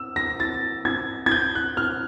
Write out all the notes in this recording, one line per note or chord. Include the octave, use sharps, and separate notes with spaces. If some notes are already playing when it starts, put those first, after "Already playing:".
Already playing: E6
A#6
A6
G#6
G#6
G6
F#6
F6